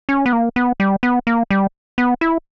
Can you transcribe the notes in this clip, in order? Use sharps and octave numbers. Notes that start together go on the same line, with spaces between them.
C#4
B3
A#3
B3
G3
B3
A#3
G3
B3
E4